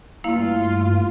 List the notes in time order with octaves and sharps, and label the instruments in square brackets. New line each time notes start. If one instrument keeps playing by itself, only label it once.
[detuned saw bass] G2 [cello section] A3 F4 [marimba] A#3 E4 F5